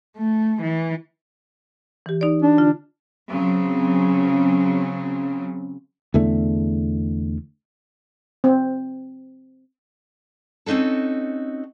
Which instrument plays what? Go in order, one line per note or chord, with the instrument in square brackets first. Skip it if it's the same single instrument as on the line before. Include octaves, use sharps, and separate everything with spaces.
[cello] A3
E3
[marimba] E3 G4
D#4 D5
[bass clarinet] D4
[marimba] D3 F4
[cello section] C#3 F#3 C4
[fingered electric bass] E2 D3 A3
[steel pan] C4
[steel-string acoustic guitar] C4 C#4 D#4 F#4 A4